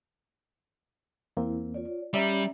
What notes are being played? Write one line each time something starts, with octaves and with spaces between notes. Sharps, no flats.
E2 A#3 C4 E4
F4 C#5 D5
G3 C#4 C#5 D5 E5 A#5